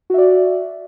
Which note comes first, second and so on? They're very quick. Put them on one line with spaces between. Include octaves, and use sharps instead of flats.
F#4 E5 D5